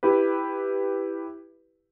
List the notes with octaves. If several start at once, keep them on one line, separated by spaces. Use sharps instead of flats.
E4 G4 B4